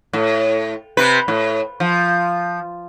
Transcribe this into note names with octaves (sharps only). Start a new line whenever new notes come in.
A2
C3 C4 B4
A2
F3